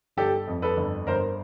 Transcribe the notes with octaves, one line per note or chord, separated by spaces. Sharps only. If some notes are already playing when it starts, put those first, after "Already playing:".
G1 G4 A4
F2
A4 B4
G1
G1 A#4 C5